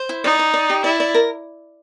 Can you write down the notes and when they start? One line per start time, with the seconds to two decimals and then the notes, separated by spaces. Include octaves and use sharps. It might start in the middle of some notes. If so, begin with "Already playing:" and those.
Already playing: C5
0.09 E4
0.24 D#4 D5
0.39 D5
0.54 D5
0.70 G4
0.84 E4 D5
1.00 D5
1.14 A#4